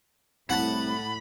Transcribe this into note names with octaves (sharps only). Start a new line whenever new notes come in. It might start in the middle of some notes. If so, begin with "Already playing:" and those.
C2 A2 F#5 A5 B5